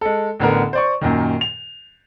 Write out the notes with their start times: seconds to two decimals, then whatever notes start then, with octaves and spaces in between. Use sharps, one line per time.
0.01 G#3 A4
0.40 A1 D3 B3 A#4
0.73 C5 D5 C#6
1.01 F#2 A#2 D#3
1.41 F7